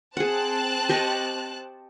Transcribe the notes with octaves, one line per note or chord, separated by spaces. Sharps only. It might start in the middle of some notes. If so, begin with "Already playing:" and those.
C4 G#4 F#5 A5 F#6
G4 D#5 C#6